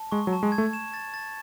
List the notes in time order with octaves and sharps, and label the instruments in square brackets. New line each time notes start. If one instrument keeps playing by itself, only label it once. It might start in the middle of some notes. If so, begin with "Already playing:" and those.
Already playing: [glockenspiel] A5
[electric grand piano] G#3 [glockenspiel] C#6
[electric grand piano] F#3
[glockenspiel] A5
[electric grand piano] G#3
[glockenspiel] G#6
[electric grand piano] A3
[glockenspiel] E7
A6
A6